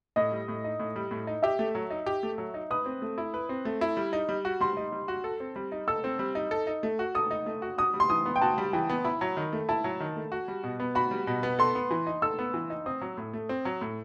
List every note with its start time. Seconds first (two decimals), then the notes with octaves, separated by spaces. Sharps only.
0.16 A2 D#5
0.32 G3
0.48 A2
0.64 D#4
0.80 A2
0.96 G3
1.11 A2
1.27 D#4
1.43 G4 E5
1.59 A3
1.75 F#3
1.90 D#4
2.06 G4
2.23 A3
2.38 F#3
2.54 D#4
2.71 B4 D#6
2.86 C4
3.02 A3
3.18 E4
3.34 B4
3.49 C4
3.65 A3
3.81 E4
3.97 G3
4.13 D#4
4.29 G3
4.45 F#4
4.61 G3 C6
4.77 D#4
4.92 G3
5.08 F#4
5.24 A4
5.40 C4
5.56 G3
5.72 D#4
5.88 A4 E6
6.04 C4
6.19 G3
6.35 D#4
6.51 A4
6.67 D#4
6.83 A3
6.99 F#4
7.15 A4 D#6
7.31 D#4
7.46 A3
7.62 F#4
7.78 F#4 D#6
7.94 G3
8.00 C6
8.10 E3 D#6
8.26 B3
8.36 G5
8.41 F#4 A5
8.58 G3
8.73 E3 G5
8.89 B3
9.05 E4 B5
9.21 F#3
9.37 D#3
9.53 A3
9.69 E4 A5
9.84 F#3
10.00 D#3
10.16 A3
10.32 F#4
10.48 G3
10.64 B2
10.80 B3
10.95 F#4 B5
11.11 G3
11.27 B2
11.43 B3
11.59 A4 C6
11.75 B3
11.91 E3
12.07 D#4
12.22 A4 E6
12.39 B3
12.54 E3
12.70 D#4
12.86 C4 D#6
13.01 F#3
13.17 A2
13.33 A3
13.49 C4
13.65 F#3
13.81 A2